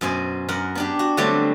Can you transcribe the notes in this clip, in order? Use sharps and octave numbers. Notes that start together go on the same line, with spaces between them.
F#2 B2 C5 G#5
F#2 A#4 F#5
B3 D4 G4
F#4
D3 F#3 G3 A3 B3 C4